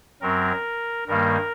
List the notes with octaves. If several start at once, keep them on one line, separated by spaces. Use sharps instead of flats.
F#2 F#3 C4 A#4
G2 D#3 G3 A#3 A#4